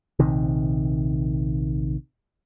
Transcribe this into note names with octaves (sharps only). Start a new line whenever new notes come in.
A#1 C3 D#3